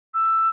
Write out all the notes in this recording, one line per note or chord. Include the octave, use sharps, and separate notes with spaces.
E6